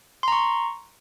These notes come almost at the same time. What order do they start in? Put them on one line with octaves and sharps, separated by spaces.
C6 A#5 C#6